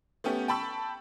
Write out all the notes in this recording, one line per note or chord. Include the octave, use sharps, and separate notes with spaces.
A3 B3 C#4 G4
G5 A5 B5 C#6 E6